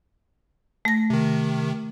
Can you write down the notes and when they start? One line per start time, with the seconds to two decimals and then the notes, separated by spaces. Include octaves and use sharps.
0.85 A3 A#6
1.10 C3 D#3